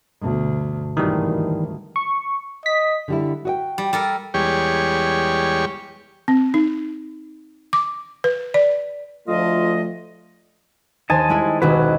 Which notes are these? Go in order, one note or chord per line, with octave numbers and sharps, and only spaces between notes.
D2 G2 B2
G#1 D2 D#3 E3 G3
C#6
D#5 B6
D3 G3 E4
F#4 D#5 G5
G3
G3 A4 A#4
E2 G3 G#3 G4 C#5 C#6
C4
D#4
D6
B4
D5
D2 F3 A3 F4 D#5
D#2 C5 D#5 G#5 A5
G3 G#3 E4
D#1 B1 D#3 F#4 B4